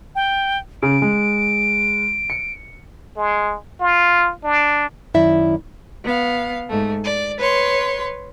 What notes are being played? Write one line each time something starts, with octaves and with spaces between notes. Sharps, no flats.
G5
C#3 D7
G#3
C#7
G#3
F4
D4
F#2 D#3 E4 D5 E5
B3 F5
G#2 A3
D5
B4 C#5 C6